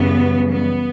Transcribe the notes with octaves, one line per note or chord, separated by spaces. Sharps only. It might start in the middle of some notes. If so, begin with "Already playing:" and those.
Already playing: F#2 C#3 E3 G3 B3
B3